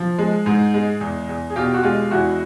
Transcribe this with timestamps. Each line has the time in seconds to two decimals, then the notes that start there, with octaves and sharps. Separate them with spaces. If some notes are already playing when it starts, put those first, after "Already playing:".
Already playing: F3
0.18 G#3
0.46 G#2
0.74 G#3
1.01 E2
1.29 E2
1.50 G#4
1.56 B2 F4 G4
1.74 F#4
1.84 G#3 F4 G4
2.11 E2 E4 F#4